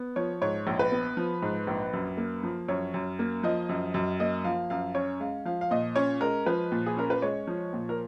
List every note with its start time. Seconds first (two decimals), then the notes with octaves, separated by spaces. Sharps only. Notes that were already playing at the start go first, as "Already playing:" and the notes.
Already playing: B3
0.16 F3 C#5
0.42 G#2 C#5
0.67 A#1
0.79 B4
0.92 B3
1.17 F3
1.42 G#2
1.67 A#1
1.93 F#2
2.17 A#3
2.43 F3
2.68 F#2 C#5
2.94 F#2
3.19 A#3
3.43 F3 D#5
3.69 F#2
3.94 F#2
4.20 A#3 D#5
4.44 F3 F5
4.70 F#2 F5
4.95 C#4 C#5
5.20 G#3 F5
5.45 F3 F5
5.61 F5
5.71 A#2 D#5
5.96 C#4 C#5
6.21 G#3 A#4
6.46 F3 B4
6.72 A#2
6.86 G#4
6.97 C#4 A#4
7.10 B4
7.22 G#3 C#5
7.47 F3
7.73 A#2
7.89 A#4